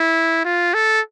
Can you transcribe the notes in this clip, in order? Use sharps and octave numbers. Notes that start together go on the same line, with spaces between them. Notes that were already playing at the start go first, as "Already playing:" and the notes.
Already playing: E4
F4
A4